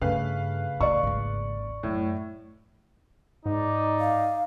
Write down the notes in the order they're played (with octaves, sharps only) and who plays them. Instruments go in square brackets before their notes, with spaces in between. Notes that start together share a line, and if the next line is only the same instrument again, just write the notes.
[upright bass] G2 [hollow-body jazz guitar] C#3 A3 [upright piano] B4 F5
[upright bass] A2 [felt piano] D5 C#6
[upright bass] G#1 D#2
[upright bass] F#2 [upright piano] A2
[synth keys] G#2 [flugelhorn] D#4 [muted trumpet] D5
[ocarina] F5